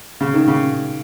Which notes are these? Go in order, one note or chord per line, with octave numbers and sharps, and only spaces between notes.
C#3
D#3
C#3